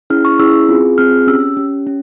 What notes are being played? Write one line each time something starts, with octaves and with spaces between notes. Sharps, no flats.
C#4 E4 G#4 F6
C#6
C#4 E4 G#4 E6
C4 F4 G#4
C4 F4 G#4 F6
C#4 G4 E6
C#4 G4
C#4